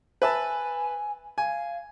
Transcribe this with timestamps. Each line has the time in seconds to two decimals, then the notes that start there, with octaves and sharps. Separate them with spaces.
0.22 B4 E5 G#5 A5
1.38 F5 G#5